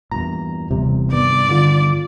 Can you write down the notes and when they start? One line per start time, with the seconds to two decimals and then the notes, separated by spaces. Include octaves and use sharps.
0.12 E2 G2 A#2 A#5
0.71 D#1 E2 C3 G3
1.12 G2 D#3 B3 D5
1.49 D3 F4